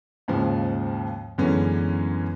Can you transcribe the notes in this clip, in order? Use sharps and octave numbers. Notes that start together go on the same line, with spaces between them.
D#2 G#2 C#3 F3
F#2 D3 E3 G#3 B3 C#4